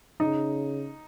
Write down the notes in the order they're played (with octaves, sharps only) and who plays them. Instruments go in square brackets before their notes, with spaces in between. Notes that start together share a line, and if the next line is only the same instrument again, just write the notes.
[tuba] C#3 [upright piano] D#4